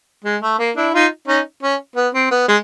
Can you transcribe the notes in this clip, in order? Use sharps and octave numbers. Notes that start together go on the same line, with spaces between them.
G#3
A3
A#3
D4 E4
D#4 F4
C#4 D#4
C#4
B3
C4
B3
G#3